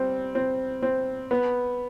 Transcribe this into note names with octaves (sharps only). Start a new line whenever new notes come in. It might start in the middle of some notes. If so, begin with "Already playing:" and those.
Already playing: G3 C4
C4
C4
B3